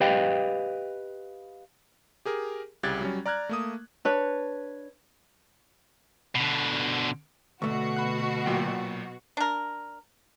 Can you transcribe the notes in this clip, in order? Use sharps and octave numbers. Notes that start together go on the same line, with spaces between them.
G4 B4 D#5 F5 G5
G4 G#4 A#4
C2 C#3 G4 F#6 G#6 A6
F#3 G3 C#4
D5 A#5 F6 F#6 G#6
A3 A#3 D#6
D4 B4 C#5
B2 D3
D2 B2 A3 F#4 C#6
B5 F#6
A#2 F#3 G5
D4 A#4